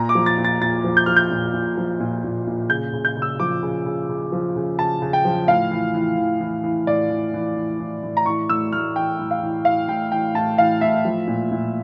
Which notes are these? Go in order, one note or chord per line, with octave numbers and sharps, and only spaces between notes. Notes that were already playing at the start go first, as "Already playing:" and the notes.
Already playing: A#2 A#5
D6
F3
A6
A#2
A6
A#2 A6
F3
G6
F3 F6
G6
A#2
A#2
F3
A#2
A#2
A#2
C#3 G6
C#3
G6
C#3
E6
F3 D6
C#3
C#3
C#3
F3
C#3
C#3 A5
C#3
G5
F3
A2 F5
E3
E3
E3
E3
E3
A2 D5
E3
E3
E3
E3
A2
A#5
E3 C#6
A2 E6
A2 F6
E3 G5
A2
F5
E3
E3 F5
A2 G5
E3 G5
A2 A5
E3 F5
A2 E5
F3
A#2
A#2